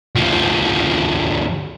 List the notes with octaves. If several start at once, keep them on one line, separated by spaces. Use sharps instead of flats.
D2 F3